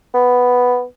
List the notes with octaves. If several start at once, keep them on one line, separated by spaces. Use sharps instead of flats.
B3